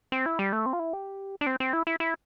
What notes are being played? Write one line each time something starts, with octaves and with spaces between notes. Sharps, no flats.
C4
E4
G3
A3
C4
F4
E4
G4
D4
C4
C4
E4
E4
E4